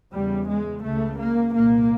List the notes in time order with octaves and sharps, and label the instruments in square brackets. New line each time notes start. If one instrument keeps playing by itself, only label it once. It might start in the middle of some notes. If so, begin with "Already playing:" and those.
[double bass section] E2 C#3 G3
G#3
C#2 C#3 A3
A#3
C2 A#2 A#3